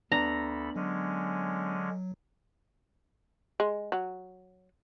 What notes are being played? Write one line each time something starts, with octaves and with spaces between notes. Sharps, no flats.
D2 B3 D4 A4 A#5 B5
D3 F#3 G#3 C#4
G#3
F#3